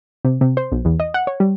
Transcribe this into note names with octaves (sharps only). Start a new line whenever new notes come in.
C3
C3
C5
B1
E2
D#5
F#5
C#5
G3